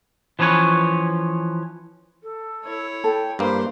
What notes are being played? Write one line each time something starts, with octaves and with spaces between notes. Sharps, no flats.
E3 F3 C#4 B4 C#5
A4
E4 C#5
A4 G5
G2 A#3 B4 C5